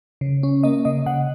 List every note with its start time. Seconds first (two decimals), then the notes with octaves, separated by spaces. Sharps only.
0.21 C#3
0.43 C#4
0.63 A#3 D#5
0.85 C#3 D#5
1.06 C#3 F#5